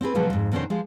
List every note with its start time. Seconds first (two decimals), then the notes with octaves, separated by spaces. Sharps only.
0.01 C4 E4 G#4 B4
0.15 B2 D3 F3 F#3 G#3
0.30 F2 G#2
0.52 F2 B2 D#3 C#4 D4 C5
0.70 F3 G#3